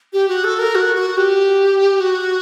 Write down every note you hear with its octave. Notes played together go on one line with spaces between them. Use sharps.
G4
F#4
A4
A#4
F#4
F#4
G4
F#4